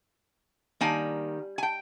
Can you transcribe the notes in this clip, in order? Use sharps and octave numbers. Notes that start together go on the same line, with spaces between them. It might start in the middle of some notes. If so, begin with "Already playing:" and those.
D#3 G3 A#3 G#5
G#5
G5